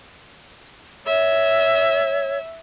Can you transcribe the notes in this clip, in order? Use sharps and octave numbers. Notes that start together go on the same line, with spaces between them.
C#5 E5